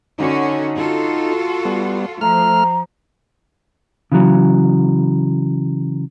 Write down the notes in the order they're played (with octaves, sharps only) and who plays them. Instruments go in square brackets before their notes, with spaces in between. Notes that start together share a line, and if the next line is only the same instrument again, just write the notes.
[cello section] D3 C#4 F#4 [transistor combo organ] D#4
[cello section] F4 F#4 A4
[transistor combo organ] G3 B3
[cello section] F3 [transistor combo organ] A3 F6 [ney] A#5
[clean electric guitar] C#3 E3 F#3